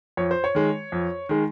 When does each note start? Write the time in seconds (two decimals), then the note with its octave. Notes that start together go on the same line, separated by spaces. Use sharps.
0.17 F2 C#5
0.31 C5
0.44 C#5
0.55 D#3 G#3
0.92 F2
1.29 D#3 G#3